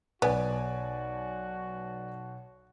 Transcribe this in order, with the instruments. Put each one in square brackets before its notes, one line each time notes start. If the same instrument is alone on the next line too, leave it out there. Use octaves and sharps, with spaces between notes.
[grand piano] B1 [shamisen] B3 [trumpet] F#4 [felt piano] B4 D5 G#5